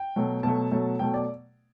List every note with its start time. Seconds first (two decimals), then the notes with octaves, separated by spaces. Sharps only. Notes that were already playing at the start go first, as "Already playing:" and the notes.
Already playing: G5
0.16 B2 F#3 A3
0.43 B2 F#3 A3 A5
0.71 B2 F#3 A3
0.99 B2 F#3 A3 G5
1.14 D5